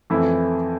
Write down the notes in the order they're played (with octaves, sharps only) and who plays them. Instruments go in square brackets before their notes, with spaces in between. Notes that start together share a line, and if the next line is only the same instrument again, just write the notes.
[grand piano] F2 E3 A3 E4